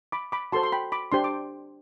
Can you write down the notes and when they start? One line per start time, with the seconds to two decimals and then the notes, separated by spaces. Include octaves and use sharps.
0.12 B5 D6
0.32 B5 D6
0.52 F#4 A4 C5 A5 C6
0.63 C6
0.72 G5 B5
0.92 B5 D6
1.12 D4 G4 C5 C6
1.24 D6